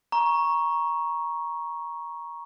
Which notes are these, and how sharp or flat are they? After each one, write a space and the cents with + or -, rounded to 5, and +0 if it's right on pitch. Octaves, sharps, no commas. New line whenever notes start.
A#5 +20 C#6 +0